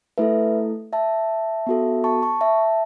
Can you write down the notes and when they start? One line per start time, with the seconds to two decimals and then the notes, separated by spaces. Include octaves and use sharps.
0.18 A3 E4 A4 B4 E5
0.93 E5 A5
1.67 B3 F#4 A4
2.04 A5 C#6
2.22 A5 C#6
2.41 E5 A5